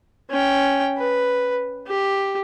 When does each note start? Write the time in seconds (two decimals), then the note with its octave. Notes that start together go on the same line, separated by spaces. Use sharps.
0.30 C#4 G5
0.98 B4
1.87 G4